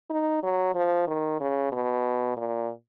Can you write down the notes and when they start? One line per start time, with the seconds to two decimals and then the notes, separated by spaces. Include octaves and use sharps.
0.10 D#4
0.43 F#3
0.75 F3
1.07 D#3
1.40 C#3
1.72 B2
2.37 A#2